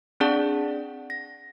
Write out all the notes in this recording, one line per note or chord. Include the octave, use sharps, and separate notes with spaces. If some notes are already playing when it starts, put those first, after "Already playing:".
C4 D4 G#4 D5 F#5 A5
A#6